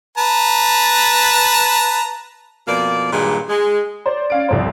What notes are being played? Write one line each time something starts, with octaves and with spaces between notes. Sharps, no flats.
B4 A5 A#5
F2 B2 A#3 D5
G2 A#2 D#3 F#3 G#3
G#3
C5 D5
C#4 F5 D7
C2 F2 C5